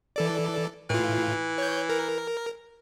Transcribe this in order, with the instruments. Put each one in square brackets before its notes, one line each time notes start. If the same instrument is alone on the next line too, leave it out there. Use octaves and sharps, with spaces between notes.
[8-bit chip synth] E3 A4 D5
[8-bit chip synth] A2 F4 [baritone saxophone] E3
[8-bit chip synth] C#5 G6
A#4